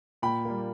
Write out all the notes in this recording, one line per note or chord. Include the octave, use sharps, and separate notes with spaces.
A#2 G5 B5
G3 A#3